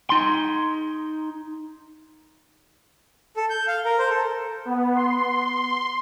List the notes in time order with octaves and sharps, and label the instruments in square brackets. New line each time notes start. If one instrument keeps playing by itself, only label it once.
[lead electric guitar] D#4 C6
[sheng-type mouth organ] A4
G6
F5
A#4
C5
A4
[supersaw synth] B3
C6